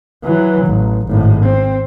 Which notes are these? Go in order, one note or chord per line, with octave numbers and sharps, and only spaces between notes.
E3 F#3
A1
G#1 A2
C4